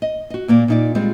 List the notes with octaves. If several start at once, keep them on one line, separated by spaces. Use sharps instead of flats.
D#5
F#4 D#5
A#2 A#3 D5
A#2 D#4 D5
G3 G#3 C4 F4